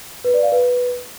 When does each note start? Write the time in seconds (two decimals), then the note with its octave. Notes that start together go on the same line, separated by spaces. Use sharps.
0.24 B4
0.34 D5
0.43 F5
0.52 B4